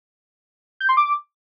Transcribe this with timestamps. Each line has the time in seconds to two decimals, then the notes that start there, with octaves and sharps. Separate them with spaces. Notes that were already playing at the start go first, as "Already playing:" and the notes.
0.80 G6
0.89 C6
0.97 D6